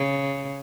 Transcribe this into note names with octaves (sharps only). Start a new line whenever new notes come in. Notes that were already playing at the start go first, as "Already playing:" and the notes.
Already playing: C#3